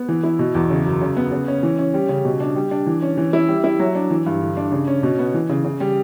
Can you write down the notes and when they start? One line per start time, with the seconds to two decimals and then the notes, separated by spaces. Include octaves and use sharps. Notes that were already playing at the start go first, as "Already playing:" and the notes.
Already playing: B3
0.09 E3
0.23 E4
0.39 B2
0.55 E2
0.70 C#3
0.86 F#2
1.02 C#3
1.17 B3
1.32 C#3
1.48 C#4
1.63 E3
1.79 C#4
1.94 G3
2.09 C#3
2.25 B2
2.40 D4
2.56 G3
2.71 D4
2.87 E3
3.02 C#4
3.17 E3
3.33 E4
3.48 G3
3.64 E4
3.79 F#3
3.95 D4
4.10 E3
4.26 G2
4.42 D3
4.57 D4
4.72 C#3
4.87 C#4
5.03 B2
5.19 B3
5.34 E3
5.50 C#3
5.64 C#3
5.80 G3